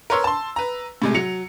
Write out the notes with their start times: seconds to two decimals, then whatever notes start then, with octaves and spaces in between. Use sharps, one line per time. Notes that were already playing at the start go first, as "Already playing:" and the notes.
0.10 A#4 B4 C#5 C6 E6
0.24 A5 C6
0.56 B4 A#5
1.02 A2 C3 G#3
1.14 F#3 C#7 F7